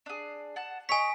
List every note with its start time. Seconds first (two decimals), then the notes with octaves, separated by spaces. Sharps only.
0.06 D4 G#4
0.56 F#5 A5
0.89 C#5 D#5 G#5 B6